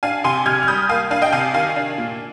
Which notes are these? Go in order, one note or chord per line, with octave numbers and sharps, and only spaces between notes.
D4 F5 G#5
C3 G#5 C6
C3 F6 G#6
F6
G3 D#6 G6
A#3 F5 G#5
D4 F5 G#5
D#5 G5
C3 F5 G#5
D#3 F5 G#5
D4
A#2